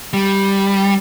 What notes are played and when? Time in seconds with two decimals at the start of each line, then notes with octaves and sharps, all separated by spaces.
0.13 G3